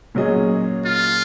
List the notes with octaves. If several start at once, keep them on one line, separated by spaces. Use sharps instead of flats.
A#2 F#3 C#4 G#4 D#5
F4